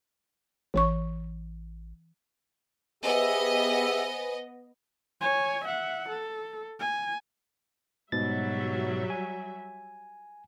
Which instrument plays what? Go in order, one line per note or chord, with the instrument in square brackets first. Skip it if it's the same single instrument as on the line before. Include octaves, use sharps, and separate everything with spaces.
[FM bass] A1 [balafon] E3 C#5 C#6
[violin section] B3 D#5 [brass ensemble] G4 G#4 E5 [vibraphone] B4 C5 G#5
[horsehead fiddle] C#5 G#5
E5 F#5
A4
G#5
[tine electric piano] G#2 B2 A6 [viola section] F#3 G3 E5
[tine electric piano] G#5